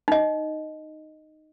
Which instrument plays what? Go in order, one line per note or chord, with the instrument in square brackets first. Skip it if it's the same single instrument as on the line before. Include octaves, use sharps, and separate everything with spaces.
[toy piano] D#4 D#5